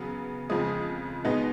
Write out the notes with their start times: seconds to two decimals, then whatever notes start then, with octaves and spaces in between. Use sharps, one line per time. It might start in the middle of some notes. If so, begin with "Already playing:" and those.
Already playing: C#3 F#3 B3
0.50 F2 C#3 F3 G#3 D#6
1.25 B2 G#3 B3 D#4